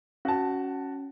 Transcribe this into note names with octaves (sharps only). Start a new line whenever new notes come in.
C#4 F#4 A5